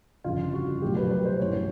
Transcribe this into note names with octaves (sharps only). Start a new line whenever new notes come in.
G1 F2 C#3 F4
F#4
C2 B2 F#3 A3 G4
B4
B4
C5
A1 G#2 E3 C#5